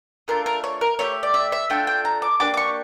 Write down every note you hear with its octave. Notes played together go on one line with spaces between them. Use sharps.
A3 D4 F4 A#4
A#4
C#5
A#4
A3 E4 G4 C#5
D5
E5
E5
A3 D4 F4 G5
G5
A#5
D6
A#3 D4 G4 D6
D6
C#6